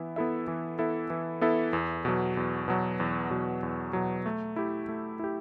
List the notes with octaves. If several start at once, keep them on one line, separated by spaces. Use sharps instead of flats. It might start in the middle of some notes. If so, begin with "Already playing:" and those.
Already playing: E3 B3 E4 E5
B3 E4 A4 E5
E3
B3 E4 A4 E5
E3
B3 E4 A4 E5
E2
B2 F#3
E2
B2 F#3
E2
B2 F#3
E2
B2 F#3
A3
E4 G4
A3
E4 G4